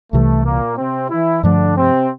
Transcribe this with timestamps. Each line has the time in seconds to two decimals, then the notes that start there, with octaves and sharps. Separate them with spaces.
0.13 C2 C3 E3 A3
0.45 A#2 A#3
0.78 C3 C4
1.10 E3 E4
1.43 G2 D3 F3 A3 D4
1.77 C3 C4